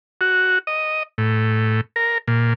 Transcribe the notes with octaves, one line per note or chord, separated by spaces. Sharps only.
F#4
D#5
A2
A#4
A#2